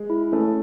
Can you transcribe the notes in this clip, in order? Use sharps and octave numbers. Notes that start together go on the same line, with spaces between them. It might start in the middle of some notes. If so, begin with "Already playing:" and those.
Already playing: G#3
E4
A3 C#4